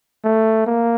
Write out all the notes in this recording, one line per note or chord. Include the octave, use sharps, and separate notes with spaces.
A3
A#3